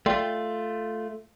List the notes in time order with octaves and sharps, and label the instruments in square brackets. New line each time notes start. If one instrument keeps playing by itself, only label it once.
[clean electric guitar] A3 F4 [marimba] D5 G5 C6